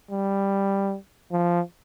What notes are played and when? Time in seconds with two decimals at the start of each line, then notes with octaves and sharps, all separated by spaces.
0.11 G3
1.32 F3